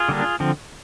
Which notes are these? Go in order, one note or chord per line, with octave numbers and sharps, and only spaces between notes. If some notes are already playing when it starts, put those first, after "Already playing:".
Already playing: F4 G#4
D3 G3 A#3 D4
D3 F3 C4